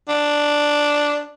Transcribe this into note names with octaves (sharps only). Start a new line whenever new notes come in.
D4